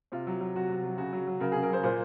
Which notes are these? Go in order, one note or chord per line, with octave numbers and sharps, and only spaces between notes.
C3 F4
F#3
F#3
C3 F#4
C3
F#3
C#3 F#4
F#3
F#3
C#3 A#4
C#3 G#4
A#4
F#3 C5
A#2 C5